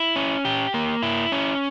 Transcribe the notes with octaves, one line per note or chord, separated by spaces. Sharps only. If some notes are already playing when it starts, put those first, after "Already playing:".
Already playing: E4
C#4
G4
A#3
E4
C#4